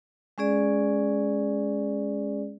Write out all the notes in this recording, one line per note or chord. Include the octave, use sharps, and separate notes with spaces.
G#3 C#4 G#4 D5